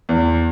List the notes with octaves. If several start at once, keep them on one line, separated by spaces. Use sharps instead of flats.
E2